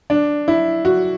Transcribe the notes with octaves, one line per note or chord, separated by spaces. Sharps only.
D4
E4
F#4